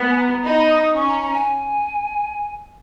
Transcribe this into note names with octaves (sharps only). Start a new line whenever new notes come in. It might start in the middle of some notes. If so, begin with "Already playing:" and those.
Already playing: B3
G#5
A#5
D#4 B5
B5
D#6
D#6
C#4 C#6
A#5
A#5
G#5